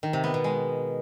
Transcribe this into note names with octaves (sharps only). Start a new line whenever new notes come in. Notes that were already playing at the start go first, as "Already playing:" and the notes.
D#3
C3
B3
B2
G#3